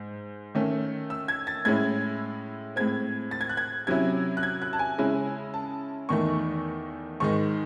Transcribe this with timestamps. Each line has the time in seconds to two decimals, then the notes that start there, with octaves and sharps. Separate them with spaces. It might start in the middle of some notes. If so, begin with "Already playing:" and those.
Already playing: G#2
0.55 D#3 A3 C#4
1.10 E6
1.28 G#6
1.47 A6
1.65 A2 G#3 C#4 E4 G#6
2.76 A2 G#3 C4 G#6
3.31 A6
3.41 G#6
3.49 F#6
3.57 G#6
3.87 C3 F#3 C#4 E4 G#6
4.37 F#6
4.43 G#6
4.62 F#6
4.73 A5
4.79 G#5
4.98 C#3 G#3 C#4 E4
5.54 A5
6.09 E2 D#3 A3 D#4 C#6
7.20 G#2 D#3 G#3 D#4 C#6